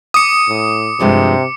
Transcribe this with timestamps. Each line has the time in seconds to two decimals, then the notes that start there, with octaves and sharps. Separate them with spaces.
0.14 D6 D#6 C#7
0.48 A2
1.00 G2 C3 F3 G#3